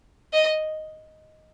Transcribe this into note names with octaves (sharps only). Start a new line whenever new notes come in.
D#5